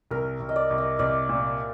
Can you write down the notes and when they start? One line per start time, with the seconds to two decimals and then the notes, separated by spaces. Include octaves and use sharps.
0.11 C2 A#4
0.40 C2
0.49 D#5
0.56 D5
0.70 C2
0.78 D#5
0.99 C2 D5
1.29 A#2